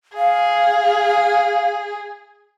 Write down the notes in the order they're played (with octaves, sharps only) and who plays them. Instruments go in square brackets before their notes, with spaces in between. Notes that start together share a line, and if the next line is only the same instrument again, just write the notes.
[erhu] G#4 [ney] F5